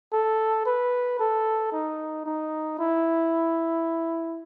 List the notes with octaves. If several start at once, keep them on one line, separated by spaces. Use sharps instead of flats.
A4
B4
A4
D#4
D#4
E4